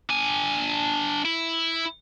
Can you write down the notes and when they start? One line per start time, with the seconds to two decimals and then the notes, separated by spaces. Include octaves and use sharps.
0.10 D4 G#5
1.25 E4